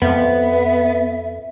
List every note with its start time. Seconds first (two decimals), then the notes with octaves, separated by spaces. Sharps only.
0.02 F2 B3 E5